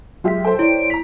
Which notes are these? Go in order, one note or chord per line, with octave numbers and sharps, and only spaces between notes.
F#3 G#3 F4 G4 E5 B6
A4 C5 G5
E4 C#5 D5 D7
A#5 B6 F7